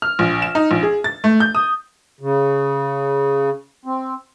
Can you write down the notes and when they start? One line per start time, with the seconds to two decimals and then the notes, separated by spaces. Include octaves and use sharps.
0.02 F6
0.19 A#1
0.42 E7
0.55 D#4
0.71 A#1
0.83 G#4
1.04 A6
1.24 A3
1.40 G6
1.55 D#6
2.21 C#3
3.85 C4